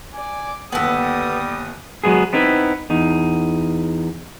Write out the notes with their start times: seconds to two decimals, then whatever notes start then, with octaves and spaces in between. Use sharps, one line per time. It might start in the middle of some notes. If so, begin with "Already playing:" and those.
0.14 D5 G#5
0.72 G1 D#2 G3 B3 A4 D#6
2.04 F#3 G#3 B3 G#4
2.33 B3 C4 D#4 E4 B4
2.90 E2 D#4